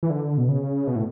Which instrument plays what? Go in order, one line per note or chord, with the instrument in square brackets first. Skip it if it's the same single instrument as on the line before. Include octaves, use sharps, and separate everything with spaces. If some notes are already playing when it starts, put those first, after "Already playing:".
[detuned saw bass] E3
D3
B2
C#3
B2
A2